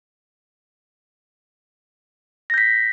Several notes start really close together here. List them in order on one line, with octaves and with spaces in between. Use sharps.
A#6 G6 B6